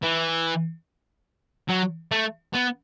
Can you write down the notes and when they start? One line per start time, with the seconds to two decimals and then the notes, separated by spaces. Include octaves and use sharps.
0.02 E3
1.69 F#3
2.12 A3
2.54 B3